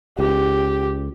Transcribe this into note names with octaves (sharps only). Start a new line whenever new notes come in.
C#2 G4